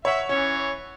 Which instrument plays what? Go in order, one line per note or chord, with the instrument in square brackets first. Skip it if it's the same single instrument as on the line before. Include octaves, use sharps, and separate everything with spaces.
[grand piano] C#5 F#5 [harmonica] E5
[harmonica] E3 C#5 [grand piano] C#4